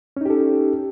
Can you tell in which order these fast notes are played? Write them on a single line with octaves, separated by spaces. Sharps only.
C#4 D#4 G4 A4